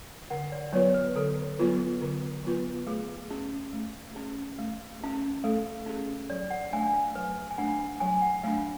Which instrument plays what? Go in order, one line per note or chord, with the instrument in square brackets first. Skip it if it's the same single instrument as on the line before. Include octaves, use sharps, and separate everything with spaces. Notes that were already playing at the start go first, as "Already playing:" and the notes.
[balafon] D3 [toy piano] F#5
[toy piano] D5
[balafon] F#3 B3 F4 B4 [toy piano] C#5
[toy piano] B4
[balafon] D3 [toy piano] A4
[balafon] F#3 B3 F4 B4
D3
F#3 B3 F4 B4
[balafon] A3 [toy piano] G#4
[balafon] C#4 G#4
A3
C#4 G#4
A3
C#4 G#4
[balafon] A3 [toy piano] A4
[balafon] C#4 G#4
[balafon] F#3 [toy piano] D5
[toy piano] F#5
[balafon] A3 D4 [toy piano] G#5
[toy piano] F5
[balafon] F#3 [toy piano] B4
[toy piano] G#5
[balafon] A3 D4 [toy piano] F#5
[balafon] F#3 [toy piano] G#5
[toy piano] F#5
[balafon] A3 [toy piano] F5
[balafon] D4